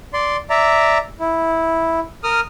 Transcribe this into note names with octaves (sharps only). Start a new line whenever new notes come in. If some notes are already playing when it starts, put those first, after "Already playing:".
D5 C6
D5 E5 A#5
E4
A#4 D#6 F6